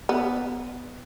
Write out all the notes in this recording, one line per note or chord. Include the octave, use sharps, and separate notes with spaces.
B3